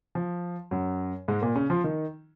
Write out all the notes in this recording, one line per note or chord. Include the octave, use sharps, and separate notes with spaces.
F3
F#2 F#3
G#2 G#3
A#2 A#3
C#3 C#4
F3 F4
D#3 D#4